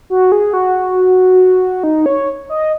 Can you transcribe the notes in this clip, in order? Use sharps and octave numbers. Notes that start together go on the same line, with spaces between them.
F#4
G#4
F#4
D#4
C#5
D#5